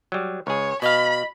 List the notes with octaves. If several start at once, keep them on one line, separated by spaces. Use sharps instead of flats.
F#3 G3
C#2 G#4 C#5
B2 D#5 F5 B5